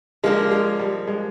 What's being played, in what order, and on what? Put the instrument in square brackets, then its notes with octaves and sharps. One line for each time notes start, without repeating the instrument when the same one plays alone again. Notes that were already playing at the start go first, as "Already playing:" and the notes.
[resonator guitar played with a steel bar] F3 A#3 D4 [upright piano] G#3
[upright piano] G#3
G3
G#3